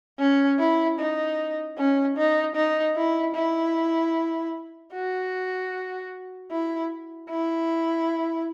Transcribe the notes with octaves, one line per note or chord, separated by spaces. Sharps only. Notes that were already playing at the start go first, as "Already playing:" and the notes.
C#4
E4
D#4
C#4
D#4
D#4
E4
E4
F#4
E4
E4